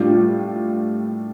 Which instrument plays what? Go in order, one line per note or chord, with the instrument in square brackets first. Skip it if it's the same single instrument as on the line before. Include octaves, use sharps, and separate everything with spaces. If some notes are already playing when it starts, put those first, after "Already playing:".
Already playing: [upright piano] A2 G3 D4 F4